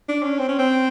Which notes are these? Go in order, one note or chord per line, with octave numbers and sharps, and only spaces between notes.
D4
C#4
C4
C#4
C4